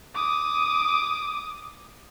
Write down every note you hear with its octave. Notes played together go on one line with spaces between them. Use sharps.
D6 D#6